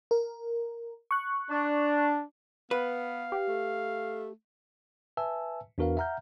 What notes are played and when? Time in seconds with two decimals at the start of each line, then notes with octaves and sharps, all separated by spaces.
0.11 A#4
1.11 C#6 F#6
1.50 D4
2.71 B3 B4 F5
3.32 G4
3.49 A3
5.17 B4 E5 G#5 A5 E6
5.78 E2 D4 F#4 A#4 B4 F5
5.97 E5 F#5 A#5 F6 G6